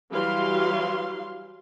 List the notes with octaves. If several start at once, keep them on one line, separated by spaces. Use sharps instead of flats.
E3 F#3 G3 F5 C6